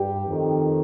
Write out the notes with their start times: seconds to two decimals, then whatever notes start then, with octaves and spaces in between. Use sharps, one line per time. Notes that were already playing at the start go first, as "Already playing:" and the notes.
Already playing: G2 G4
0.27 F2 D#3